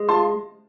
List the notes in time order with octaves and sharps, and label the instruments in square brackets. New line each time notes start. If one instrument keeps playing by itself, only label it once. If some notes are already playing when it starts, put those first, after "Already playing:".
Already playing: [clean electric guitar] G#3
[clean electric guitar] F4 [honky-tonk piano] A5 C6